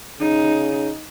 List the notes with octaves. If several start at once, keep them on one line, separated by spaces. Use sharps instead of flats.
C#3 D#4